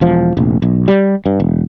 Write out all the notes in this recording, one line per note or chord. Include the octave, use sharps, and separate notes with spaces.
E1 F3
F1 A#1
B1
G3
G2
E1